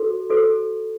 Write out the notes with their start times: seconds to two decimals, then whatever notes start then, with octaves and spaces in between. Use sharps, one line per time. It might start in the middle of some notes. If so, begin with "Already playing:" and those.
Already playing: F#4 A4 C5
0.30 F#4 A4 C5